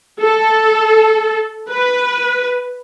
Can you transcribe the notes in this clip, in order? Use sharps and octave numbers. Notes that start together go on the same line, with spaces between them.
A4
B4